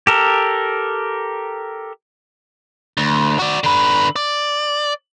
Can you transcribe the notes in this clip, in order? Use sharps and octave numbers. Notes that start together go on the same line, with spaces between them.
G4 A4 A#4
D2
F#4 D5
D3 B4
D5